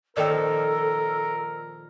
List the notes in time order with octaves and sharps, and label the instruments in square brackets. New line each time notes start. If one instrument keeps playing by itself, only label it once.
[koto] A#2 D#3 F3 [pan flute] A4 [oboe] A#4 [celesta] D5 D#5 G5